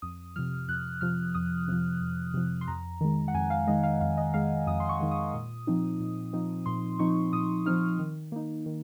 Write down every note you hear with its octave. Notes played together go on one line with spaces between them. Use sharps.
F2 D#6
C3 F3 F6
F2 F#6
C3 F3 F6
F2 D#6
C3 F3
F2
C3 F3
C6
F2 A#5
D#3 G#3
F#5
F2 G#5
F5
D#3 G#3 D#5
F5
F2 F5
D#5
D#3 G#3 F5
F2 D#6
C6
C#6
D#3 G#3
D#6
A#2
F3 C4 D#4
A#2
F3 C4 D#4
A#2 C6
F3 C4 D#4 C#6
A#2 D#6
F3 C4 D#4 F6
D#3
A#3 D#4
D#3